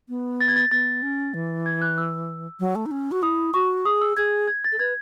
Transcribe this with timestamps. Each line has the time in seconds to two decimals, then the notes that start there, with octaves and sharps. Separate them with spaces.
0.09 B3
0.41 A6
0.48 G#6
0.56 A6
0.71 B3 A6
1.02 C#4
1.34 E3
1.66 G#6
1.82 F#6
1.98 E6
2.60 F#3
2.75 A3
2.86 D#4
2.91 C#4
3.11 F#4
3.22 E4 D#6
3.54 F#4 C#6
3.85 G#4 D#6
4.01 E6
4.17 G#4 G#6
4.48 G#6
4.64 A6
4.72 A4
4.79 B4 G#6